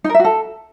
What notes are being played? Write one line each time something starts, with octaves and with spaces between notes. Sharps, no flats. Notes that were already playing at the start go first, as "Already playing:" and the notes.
D#4
A#4
E5
F#4
A4